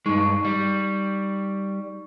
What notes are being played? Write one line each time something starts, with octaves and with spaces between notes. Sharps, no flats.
G2 G#3 D#4 C#6
G3